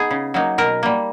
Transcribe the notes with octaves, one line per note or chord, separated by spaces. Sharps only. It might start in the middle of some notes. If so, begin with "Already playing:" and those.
Already playing: B3 D#4 G#4
C#3
F#3 A#3 D#4
B2 A#4
G3 A#3